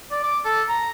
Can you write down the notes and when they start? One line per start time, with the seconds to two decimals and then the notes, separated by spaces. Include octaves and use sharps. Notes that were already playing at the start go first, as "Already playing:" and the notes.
0.11 D5
0.23 D6
0.45 A4
0.69 A#5